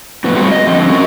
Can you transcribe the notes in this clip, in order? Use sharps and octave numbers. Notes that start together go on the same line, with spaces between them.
F2 A2 B3
A#2 G3 G#3 B3 C4 F#4
D#5
D3 F3 C4
C#4 F#4 A#4